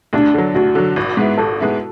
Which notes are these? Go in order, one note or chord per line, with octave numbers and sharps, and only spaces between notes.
D2 D4
D3 F#3
D2 F#4
D3 F#3
G#1
G#2 G#3 B3 E4
G#1 A4
G#2 G#3 B3 E4